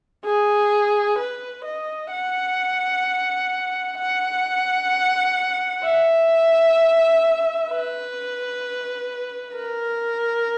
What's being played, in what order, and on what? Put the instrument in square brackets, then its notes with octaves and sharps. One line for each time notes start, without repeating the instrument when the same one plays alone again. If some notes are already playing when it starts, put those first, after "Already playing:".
[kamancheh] G#4
B4
D#5
F#5
F#5
E5
B4
A#4